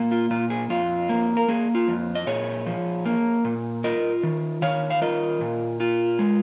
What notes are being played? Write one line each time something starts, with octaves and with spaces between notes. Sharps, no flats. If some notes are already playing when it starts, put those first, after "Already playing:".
Already playing: A#2 A#3
F4
A#2 F4
G#4
F2 F4
A#3
A#4
A#3 G#4
F4
F2
D#5
A#2 G#4 C#5
F3
A#3
A#2
F4 A#4 D#5
D#3
D#3 C#5 F5
F5
F4 A#4 D#5
A#2
F4
G#3